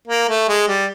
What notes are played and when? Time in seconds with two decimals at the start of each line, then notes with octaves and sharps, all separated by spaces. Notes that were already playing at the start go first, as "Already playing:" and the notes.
0.08 A#3
0.29 A3
0.49 G#3
0.68 G3